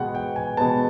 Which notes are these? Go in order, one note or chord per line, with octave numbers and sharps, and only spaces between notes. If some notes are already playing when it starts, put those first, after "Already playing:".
Already playing: B2 G#3 B3 F#5 G5
G5
G#5
B2 G#3 B3 A5